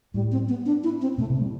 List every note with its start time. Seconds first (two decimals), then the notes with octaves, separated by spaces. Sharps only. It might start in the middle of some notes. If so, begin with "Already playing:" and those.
0.14 A2 G3
0.32 C4
0.48 B3
0.66 D4
0.83 E4
1.01 C4
1.18 B2 A3
1.30 C3
1.41 G3